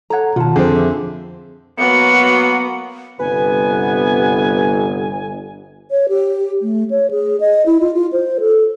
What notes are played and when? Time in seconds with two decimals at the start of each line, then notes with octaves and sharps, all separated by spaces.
0.10 A4 C#5 F#5 A#5
0.36 B2 D#3 F4 F#5 A5
0.56 F2 D3 C4 F4 G#4 C5 F5
0.75 G4 E5
1.78 F#3 A#3 B3 F#4 C#7
3.20 G1 C3 G3 B3 B4 G#5
5.91 C#5
6.09 G4
6.62 A3
6.90 C#5
7.11 G#4
7.40 D#5
7.66 E4
7.80 F4
7.94 F4
8.13 C5
8.40 A4